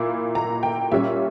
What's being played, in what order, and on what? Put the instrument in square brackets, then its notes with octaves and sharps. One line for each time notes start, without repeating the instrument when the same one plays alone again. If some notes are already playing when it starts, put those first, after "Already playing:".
Already playing: [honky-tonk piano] A#2 A#3 E4
A#5
G5
A#2 G3 C#4 E5